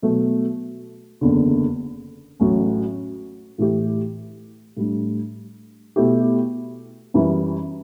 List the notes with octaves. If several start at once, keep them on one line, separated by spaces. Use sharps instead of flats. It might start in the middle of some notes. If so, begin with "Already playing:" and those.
B2 F#3 A3
F#1 E2 D3
A1 A2 F#3 C#4
A2 E3 A3 E4 G4
A2 G3 D4
B2 A3 E4 G4
F#2 E3 G3